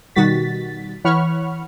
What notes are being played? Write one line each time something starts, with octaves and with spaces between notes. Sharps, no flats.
B2 D#3 G3 F#4 A6 B6
E3 C#5 F#5 B5 C#6 F6